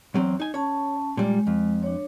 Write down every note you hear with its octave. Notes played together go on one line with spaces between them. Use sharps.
E2 F#3 C4
D#4 G#5
C#4 C#5 A5
A#2 G3 G#3
F2
D4 C#5